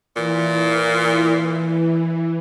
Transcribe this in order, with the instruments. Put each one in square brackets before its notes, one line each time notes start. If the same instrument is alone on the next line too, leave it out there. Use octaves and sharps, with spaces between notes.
[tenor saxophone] A#2 [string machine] E3